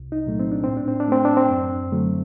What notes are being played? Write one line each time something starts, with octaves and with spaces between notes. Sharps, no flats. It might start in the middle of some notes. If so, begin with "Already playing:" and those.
Already playing: C2
D#4
A#2 F#3 A3
C4
D4
A2 C4
D4
C4
D4
A3 C4
D4
C4
F#2
D3 F#3 A3